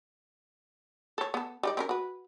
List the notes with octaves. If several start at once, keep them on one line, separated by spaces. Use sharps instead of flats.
A4 C#5
B3 A4
G3 D#4 D5
C4 C#4 A#4
F#4 B4